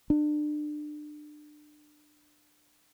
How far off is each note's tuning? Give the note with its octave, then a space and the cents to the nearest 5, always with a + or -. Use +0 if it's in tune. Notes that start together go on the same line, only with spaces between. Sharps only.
D4 +30